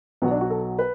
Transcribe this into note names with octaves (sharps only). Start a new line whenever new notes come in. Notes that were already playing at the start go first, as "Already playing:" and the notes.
B1 B2 F#3 B3
D4
F#4
A4
B4